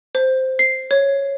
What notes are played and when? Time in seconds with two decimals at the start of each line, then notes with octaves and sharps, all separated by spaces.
0.15 C5
0.59 C7
0.91 C#5